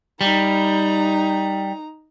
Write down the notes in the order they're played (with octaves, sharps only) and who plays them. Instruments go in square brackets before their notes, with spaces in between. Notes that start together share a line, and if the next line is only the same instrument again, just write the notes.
[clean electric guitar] G3 [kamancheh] D#4 A#5